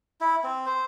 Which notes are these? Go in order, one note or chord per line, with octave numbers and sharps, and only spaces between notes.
E4
C4
C5